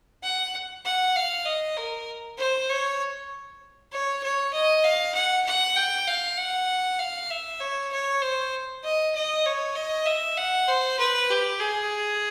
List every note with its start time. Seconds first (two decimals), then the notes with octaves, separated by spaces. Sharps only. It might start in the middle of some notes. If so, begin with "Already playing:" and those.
0.23 F#5
0.85 F#5
1.16 F5
1.46 D#5
1.77 A#4
2.38 C5
2.69 C#5
3.92 C#5
4.23 C#5
4.53 D#5
4.84 F5
5.15 F#5
5.46 F#5
5.76 G5
6.07 F5
6.38 F#5
6.99 F5
7.31 E5
7.60 C#5
7.92 C#5
8.22 C5
8.84 D#5
9.15 D#5
9.46 C#5
9.76 D#5
10.06 E5
10.37 F#5
10.68 C5
10.99 B4
11.30 G4
11.60 G#4